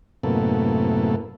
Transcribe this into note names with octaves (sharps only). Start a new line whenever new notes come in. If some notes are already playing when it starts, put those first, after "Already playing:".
F#2 A2 C3 A#3 B3 A4